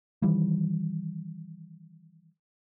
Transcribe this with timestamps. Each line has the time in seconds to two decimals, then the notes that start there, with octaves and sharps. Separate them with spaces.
0.22 D#3 E3 G3